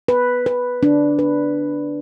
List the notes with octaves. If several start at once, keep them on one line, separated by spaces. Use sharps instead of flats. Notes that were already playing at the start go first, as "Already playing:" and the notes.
B4
B4
D4
B4